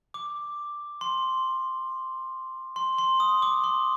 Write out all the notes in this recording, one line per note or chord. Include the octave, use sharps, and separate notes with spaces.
D6
C6
C6
C6
D#6
D6
C6